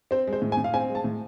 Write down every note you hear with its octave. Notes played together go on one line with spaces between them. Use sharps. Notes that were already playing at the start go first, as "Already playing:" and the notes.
C4 C5
G#3
C5
A2
G#5
A2
F5
C4 G#5
G#3
A5
A2